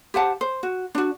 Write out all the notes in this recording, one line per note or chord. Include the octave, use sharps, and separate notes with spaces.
G4 C5 F#5 A5
C5
F#4
D4 F#4